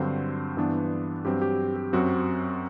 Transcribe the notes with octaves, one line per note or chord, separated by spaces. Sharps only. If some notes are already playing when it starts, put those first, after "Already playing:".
Already playing: G2 D3 F#3 C4 C5
G2 E3 B3 D4
G2 F#3 C4 G4
G4
G4
F#2 F#3 C4 F#4